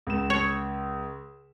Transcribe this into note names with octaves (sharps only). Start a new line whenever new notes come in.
C#2 E7
C#5